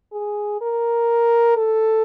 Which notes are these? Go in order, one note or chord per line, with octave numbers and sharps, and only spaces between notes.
G#4
A#4
A4